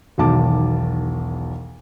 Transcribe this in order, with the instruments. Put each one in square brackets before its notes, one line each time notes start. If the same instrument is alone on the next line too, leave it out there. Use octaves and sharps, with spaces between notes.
[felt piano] E1 B1 D#3 A5 D6